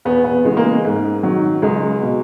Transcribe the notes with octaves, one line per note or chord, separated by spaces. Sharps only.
E2 B3
B3
C#3 E3 G#3
A#3
G#3
G#2
D#3 F#3
C#2 G#3
B2